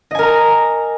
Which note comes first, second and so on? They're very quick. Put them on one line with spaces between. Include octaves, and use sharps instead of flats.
D#5 G#5 A#4 A#5